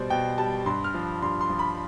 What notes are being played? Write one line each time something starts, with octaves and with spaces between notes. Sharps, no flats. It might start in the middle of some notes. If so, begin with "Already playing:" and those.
Already playing: B2 G3 C5 D5
B2 G5
G3 A5
G2 C6
F6
F3
G2 C6
C6
F3
B5